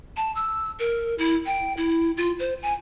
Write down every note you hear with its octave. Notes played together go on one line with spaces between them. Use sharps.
A5
E6
A#4
E4
G5
E4
F4
C5
G#5